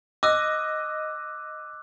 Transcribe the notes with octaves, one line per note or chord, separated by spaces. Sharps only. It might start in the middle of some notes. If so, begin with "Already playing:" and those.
D#5 D6 E6 F#6